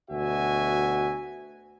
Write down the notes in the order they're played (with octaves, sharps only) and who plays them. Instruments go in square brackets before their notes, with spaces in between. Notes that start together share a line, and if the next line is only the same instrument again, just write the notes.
[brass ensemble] D2 B2 F#4 E5 G#5